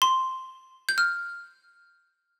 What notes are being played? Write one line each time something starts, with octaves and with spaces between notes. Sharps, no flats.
C6
G6
F6